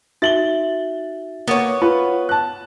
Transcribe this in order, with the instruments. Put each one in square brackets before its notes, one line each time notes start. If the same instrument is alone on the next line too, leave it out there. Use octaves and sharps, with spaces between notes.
[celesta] D#4 F#4 E5 [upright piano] A6 F#7 G7
[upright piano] A#3 [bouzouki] B3 C#5
[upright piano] F4 B4
A5 F#6